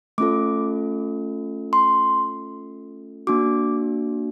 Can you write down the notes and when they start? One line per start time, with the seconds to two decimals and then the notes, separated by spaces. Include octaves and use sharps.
0.18 A3 C#4 F4 A4 D6
1.73 C6
3.27 A#3 D4 F#4 D6